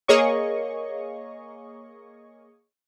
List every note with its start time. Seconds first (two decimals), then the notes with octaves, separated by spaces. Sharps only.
0.08 A#3 G#4 C#5 D#5 C#6